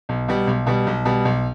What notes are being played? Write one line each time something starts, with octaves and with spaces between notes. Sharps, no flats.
B1
B2 G3
B1
B2 G3
B1
B2 G3
B1